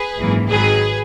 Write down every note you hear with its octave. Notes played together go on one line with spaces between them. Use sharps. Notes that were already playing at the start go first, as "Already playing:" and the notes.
Already playing: G#4 B4
G#1 F#2 E3 A#3
G#1 G#2 D#3 F#3 G#4 B4